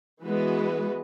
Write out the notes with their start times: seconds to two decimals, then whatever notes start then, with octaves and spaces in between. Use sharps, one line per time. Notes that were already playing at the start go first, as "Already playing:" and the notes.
0.23 E3 G#3 B3 F#4 B4